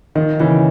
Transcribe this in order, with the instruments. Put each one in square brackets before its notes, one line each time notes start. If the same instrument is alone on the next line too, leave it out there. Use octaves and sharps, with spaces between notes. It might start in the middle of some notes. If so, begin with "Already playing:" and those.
[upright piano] D#3 [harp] F3
[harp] C#3 [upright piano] E3